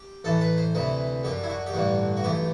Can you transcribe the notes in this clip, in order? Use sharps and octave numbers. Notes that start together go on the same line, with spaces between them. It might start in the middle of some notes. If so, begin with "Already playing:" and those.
Already playing: G4
A1 A2 E3 A4
B4
C5
D2 C3 E3 B4
F#2 D3 G4
E4
F#4
G4
A1 G2 D3 F#4
F#4
B1 A2 E3 G4